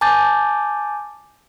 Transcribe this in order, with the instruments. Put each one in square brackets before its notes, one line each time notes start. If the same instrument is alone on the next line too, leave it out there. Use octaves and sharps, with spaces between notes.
[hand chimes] G#5 A5 D6 G6 A6